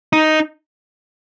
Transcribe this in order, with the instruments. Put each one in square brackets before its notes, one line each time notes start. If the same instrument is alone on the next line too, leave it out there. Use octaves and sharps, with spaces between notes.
[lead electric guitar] D#4